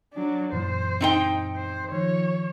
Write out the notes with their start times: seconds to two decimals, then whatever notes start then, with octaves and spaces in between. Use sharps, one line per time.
0.14 F#3 D4
0.53 F#2 A#2 E3 C5
1.01 C4 D#4 G5
1.56 C5
1.92 D#3 F3 C#5